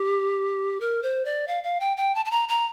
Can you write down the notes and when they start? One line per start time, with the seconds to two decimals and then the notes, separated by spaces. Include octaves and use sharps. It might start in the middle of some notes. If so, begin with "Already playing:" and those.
Already playing: G4
0.81 A#4
1.03 C5
1.25 D5
1.48 F5
1.64 F5
1.80 G5
1.97 G5
2.15 A5
2.25 A5
2.31 A#5
2.49 A#5